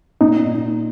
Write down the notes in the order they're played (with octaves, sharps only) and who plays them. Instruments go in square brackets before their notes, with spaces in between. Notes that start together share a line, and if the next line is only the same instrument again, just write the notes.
[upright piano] A#2 [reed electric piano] D#4